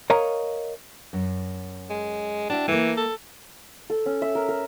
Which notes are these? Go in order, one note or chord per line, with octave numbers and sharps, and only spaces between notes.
A#4 C#5 D#5 F5 A#5
F#2
G#3
D4 E4 F#4 G5
E3 A3 A#3
A4
A4
C#4
E5
A#4
A#4